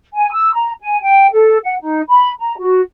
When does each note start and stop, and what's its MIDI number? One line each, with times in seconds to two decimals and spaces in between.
0.13 0.30 80
0.32 0.49 88
0.53 0.71 82
0.81 0.98 80
1.02 1.27 79
1.31 1.57 69
1.64 1.74 78
1.81 2.00 63
2.08 2.31 83
2.39 2.58 82
2.58 2.80 66